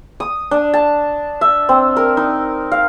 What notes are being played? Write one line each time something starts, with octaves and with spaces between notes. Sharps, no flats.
D#6
D4
A5
E5
C4
A#4
D#4
F5